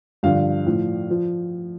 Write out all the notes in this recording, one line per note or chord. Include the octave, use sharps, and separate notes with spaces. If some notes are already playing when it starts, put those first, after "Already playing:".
G2 D3 F3 F5
A2 F3
F3